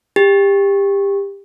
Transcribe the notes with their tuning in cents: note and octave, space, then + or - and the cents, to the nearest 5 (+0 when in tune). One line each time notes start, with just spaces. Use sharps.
G4 +20